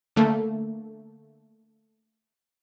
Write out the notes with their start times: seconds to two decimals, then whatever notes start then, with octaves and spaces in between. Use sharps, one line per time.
0.16 D3 A3 A#3